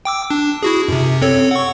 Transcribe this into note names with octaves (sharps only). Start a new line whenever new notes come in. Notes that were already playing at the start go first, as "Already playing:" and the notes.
G5 D6 E6
D4
E4 F#4 G#4
F#2 C3
C4 A4 C#5
F#5 C#6